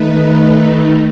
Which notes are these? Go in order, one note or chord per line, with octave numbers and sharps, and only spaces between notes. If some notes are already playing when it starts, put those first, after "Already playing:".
Already playing: D#3 A3 D#4 B4